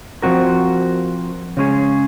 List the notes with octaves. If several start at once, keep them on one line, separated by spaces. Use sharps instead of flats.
F3 G#3 C4 F#4 A#4
C#3 G#3 C#4 G#4